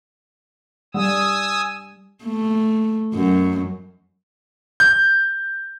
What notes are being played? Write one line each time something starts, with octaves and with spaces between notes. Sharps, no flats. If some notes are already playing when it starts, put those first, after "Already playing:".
G3 G#5 D#6 E6
A3
F#2
G6